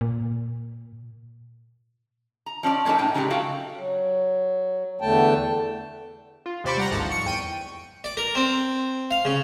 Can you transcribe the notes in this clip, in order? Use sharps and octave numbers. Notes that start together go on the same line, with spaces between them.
A#2
A#5
F3 C#4 C#5 D5
F#3 A#3 C#4 D#4 A4
A2 D#4 G5
C#3 F#3 G#3 C4 G4
F#4 A4 F5 G5
F#3
E2 D3 A3 G5 A5
F4
D#2 C3 C5 D5 B5 C#6
G3 F#5 A#5
G#1 D2 G#2 F3 A4 F#5
C#6 C#7
E2 G5 D#7
D5
A#4
C4
F5
C#3